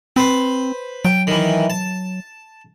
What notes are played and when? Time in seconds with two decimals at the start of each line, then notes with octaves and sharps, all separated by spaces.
0.16 C4 B4 C5
1.05 F#3 G5
1.27 D#3 E3
1.70 A5